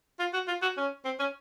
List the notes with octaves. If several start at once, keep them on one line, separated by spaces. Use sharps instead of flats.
F4
F#4
F4
F#4
C#4
C4
C#4